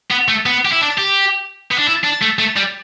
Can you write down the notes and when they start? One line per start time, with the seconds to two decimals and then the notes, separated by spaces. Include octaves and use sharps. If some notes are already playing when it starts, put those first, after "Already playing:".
0.11 B3
0.28 A3
0.46 B3
0.65 G4
0.72 E4
0.81 D4
0.98 G4
1.71 B3
1.78 D4
1.87 E4
2.04 D4
2.22 A3
2.39 A3
2.57 G3